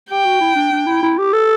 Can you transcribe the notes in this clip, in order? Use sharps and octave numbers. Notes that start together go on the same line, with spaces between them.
G4 G5
F#4
E4
D4
D4
E4
E4
G4
A4